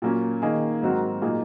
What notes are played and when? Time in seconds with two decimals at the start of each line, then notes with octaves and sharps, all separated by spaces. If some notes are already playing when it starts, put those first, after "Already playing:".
0.02 A#2 F#3 A#3 C#4
0.42 D#3 A#3 D#4 G#4
0.82 G#2 F#3 C4 F#4 A#4
1.22 A#2 F#3 A#3 D#4 G#4